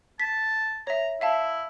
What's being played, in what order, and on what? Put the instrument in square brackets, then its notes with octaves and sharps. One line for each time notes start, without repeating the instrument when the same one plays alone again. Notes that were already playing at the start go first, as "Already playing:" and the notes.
[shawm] A5 [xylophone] B6
[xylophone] C#5 E5 [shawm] A#5
[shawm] E4 [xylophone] E5 F5 A5